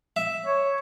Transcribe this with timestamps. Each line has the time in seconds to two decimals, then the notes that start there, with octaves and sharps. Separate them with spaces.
0.16 E5
0.46 C#5